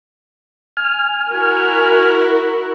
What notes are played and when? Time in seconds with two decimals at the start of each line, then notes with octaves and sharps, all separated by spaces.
0.77 G#5 F6
1.30 E4 F#4 A#4